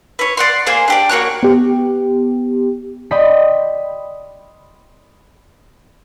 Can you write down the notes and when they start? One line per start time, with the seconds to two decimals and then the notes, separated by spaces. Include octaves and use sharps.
0.19 B4 C#5
0.37 D5 F#5 C6
0.66 A#3 G#4 C5
0.88 D4 G4 D5
1.09 A#3 F#4 C#5 F#6
1.43 B3 G4
3.11 D5 D#5 G5 B5 C6